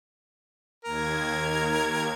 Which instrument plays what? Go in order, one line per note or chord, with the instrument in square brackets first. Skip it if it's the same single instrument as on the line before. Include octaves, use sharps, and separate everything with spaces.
[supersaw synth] D#2 G#6 [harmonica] A#4